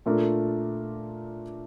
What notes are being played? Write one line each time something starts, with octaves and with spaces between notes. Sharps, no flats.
A#2 A3 D4 F4 A#4